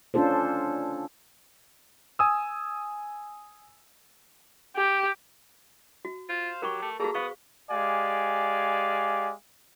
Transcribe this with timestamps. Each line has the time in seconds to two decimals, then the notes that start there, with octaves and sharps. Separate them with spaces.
0.14 C#4 D4 F4 A4 C5
2.19 G#5 D#6 E6
4.76 G4
6.05 F#4
6.29 F4 C5 F5
6.62 F#3 G4 A#4 B5 C#6
6.82 A3
7.00 G3 A#3 F#4 G#4 A4 A#5
7.14 B3 C5 F5 C#6 D#6
7.71 G#3 G4 D5 F5 G#5